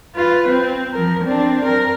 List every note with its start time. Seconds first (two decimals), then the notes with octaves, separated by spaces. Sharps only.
0.16 F4 B4
0.48 C4
0.94 F3 A#4
1.24 C4 D4
1.65 A#4